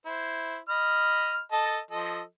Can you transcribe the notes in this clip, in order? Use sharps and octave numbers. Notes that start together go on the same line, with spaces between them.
E4 C5
D#5 B5 F6
A4 D#5 A5
F3 A4 D#5